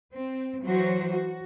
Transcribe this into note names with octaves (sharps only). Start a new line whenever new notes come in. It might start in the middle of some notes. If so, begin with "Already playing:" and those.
C4
E3 F#3 F#4 C5
F#4